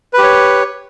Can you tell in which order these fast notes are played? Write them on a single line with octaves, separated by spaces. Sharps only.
B4 G4 C#5